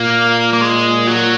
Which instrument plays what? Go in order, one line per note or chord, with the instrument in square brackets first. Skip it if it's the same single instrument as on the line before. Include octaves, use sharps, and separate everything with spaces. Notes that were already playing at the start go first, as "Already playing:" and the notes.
Already playing: [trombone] A#2 [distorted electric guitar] A#3
[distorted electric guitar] A#3
G#3
F#3